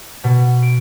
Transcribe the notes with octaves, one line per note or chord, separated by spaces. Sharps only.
B2
D7